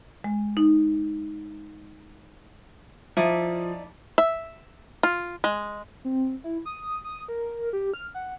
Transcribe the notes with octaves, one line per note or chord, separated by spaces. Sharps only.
G#3
D#4
F3 D#4 E4 D5
E5
F4
G#3
C4
E4
D#6
D#6
A#4
G4
F6
F#5